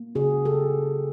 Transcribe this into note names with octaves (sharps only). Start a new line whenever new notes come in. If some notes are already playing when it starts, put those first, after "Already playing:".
Already playing: A#3
C#3 F#4 G#4
C#3 G4 A4